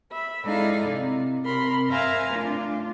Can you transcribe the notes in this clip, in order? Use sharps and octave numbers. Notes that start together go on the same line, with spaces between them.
E5 B5
G#3 D#4 E4 A4 D5 F5
C3
C3 A#4 B5 C6
A#4 C5 E5 F5 G#5 A#5
A3 D4 F4